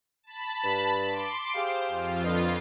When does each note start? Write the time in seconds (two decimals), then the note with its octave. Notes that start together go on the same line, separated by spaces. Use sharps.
0.23 A5 B5
0.64 G2
1.08 C6 D6 D7
1.55 G4 G#4 C5 F5
1.88 F2 F4
2.24 D3 B4 D#5